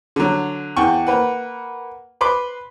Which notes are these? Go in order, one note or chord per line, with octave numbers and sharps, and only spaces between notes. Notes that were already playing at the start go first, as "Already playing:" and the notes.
D3 F#3
E2 F#5 G5 C#6
A#3 B4 F#5
B4 B5 C6 D6